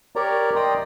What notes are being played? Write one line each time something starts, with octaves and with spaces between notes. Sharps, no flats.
G4 A#4 C#5 D5 A#5
D5 D#5 G5 A#5 C6 D#6